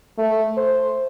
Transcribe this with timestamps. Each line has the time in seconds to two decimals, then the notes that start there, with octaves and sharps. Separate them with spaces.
0.18 A3
0.57 C5